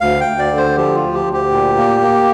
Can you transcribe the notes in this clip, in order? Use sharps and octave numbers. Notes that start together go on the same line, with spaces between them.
D2 F5
G5
D2
D5
D3
C5
F3 G4
F4
D2
G4
D2
G4
A#2
A#3
A#3